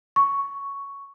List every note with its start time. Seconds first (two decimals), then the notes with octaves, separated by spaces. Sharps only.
0.16 C#6